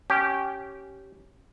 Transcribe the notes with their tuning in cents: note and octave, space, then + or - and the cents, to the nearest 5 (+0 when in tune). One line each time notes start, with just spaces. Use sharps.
C#4 +0 G4 -15